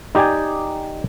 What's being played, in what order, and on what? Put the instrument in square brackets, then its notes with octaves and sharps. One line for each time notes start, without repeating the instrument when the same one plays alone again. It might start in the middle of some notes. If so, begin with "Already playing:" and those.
[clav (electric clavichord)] D#4 G4 D5 G5 G#5